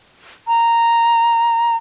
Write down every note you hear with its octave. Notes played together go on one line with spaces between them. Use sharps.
A#5